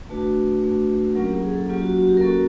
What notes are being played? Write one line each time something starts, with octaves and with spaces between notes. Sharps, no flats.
A3 D4 F#4 B4
A3 D4 F#4
F#3 A#3 C#4 F4 A#4
G4
G#4
A4
F#3 A#3 C#4 F4 G4
F#4
F#4
G4
A#4
A#3 C#4 F#4 A4